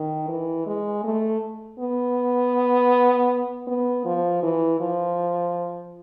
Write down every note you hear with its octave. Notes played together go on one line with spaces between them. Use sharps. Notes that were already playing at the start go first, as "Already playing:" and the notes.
Already playing: D#3
E3
G#3
A3
B3
B3
F3
E3
F3